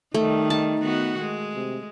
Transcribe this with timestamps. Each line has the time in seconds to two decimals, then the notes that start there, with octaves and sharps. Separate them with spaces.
0.14 D#3 G3 A3 D#4
0.50 A5
0.80 D#3 B3 F#4
1.20 G#3
1.55 C3